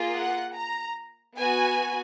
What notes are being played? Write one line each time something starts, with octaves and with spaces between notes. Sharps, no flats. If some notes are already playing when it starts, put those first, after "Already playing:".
Already playing: A#3 F4 G#4
F#5
A#5
B3 F#4 G#5